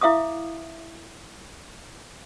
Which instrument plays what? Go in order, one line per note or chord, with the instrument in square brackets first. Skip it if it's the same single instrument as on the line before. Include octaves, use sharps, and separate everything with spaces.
[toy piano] E4 E5 F5 D6 D#6